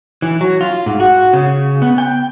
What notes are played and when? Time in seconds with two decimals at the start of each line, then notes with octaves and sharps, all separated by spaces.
0.22 E3
0.41 F#3
0.61 F4
0.86 G#2
1.00 F#4
1.33 C#3
1.82 B3
1.98 G5